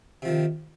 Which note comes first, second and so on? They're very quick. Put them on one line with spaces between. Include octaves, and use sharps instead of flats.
C3 F3 D#3